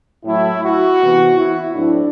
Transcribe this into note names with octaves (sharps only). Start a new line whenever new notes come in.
A2 F#3 A3 E4
F#4
C3 E3 B3
E4
A2 F#3 A3 C4 D4